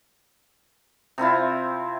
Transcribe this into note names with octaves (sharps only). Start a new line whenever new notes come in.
C3 C4 E4 F4